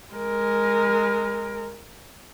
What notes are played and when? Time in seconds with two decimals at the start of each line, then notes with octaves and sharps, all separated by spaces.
0.14 G#3 A#4